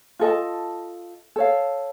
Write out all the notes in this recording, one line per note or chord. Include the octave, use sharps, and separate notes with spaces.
F4 A4 D#5 A5
A4 C#5 F5